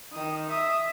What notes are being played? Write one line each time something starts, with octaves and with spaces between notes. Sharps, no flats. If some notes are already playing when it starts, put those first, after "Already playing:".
D#3 D#6
E5 D#6